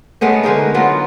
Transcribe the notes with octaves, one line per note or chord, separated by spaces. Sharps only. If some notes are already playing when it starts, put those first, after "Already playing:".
G#3 A3 B3 C#4
D3 G#3 D#4 A#4
F#3 B3 F4